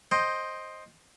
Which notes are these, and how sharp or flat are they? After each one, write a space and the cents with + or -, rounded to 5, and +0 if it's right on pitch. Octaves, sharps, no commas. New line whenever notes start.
C5 +10 D#5 +0 G5 +0